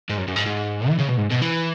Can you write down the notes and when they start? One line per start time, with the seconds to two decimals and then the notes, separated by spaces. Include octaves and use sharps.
0.10 G#2
0.18 F#2
0.28 F#2
0.36 G#2
0.46 G#2
0.89 E3
0.98 C#3
1.08 B2
1.17 G#2
1.30 B2
1.42 E3